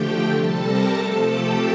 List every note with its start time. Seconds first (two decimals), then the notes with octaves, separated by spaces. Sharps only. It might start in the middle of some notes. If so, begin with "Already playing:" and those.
Already playing: D3 F3 A3 G4 G5
0.31 C3 G3 A4 A5
0.62 A#4 A#5
0.93 C3 F3 A3 A4 A5
1.23 G4 G5